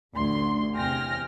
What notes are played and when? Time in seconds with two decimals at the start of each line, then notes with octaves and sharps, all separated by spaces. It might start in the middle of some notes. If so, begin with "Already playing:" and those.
0.13 A1 D2 C6
0.75 E2 C3 G5 G#5 F6 A#6